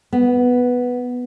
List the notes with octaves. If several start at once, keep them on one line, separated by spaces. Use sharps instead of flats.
B3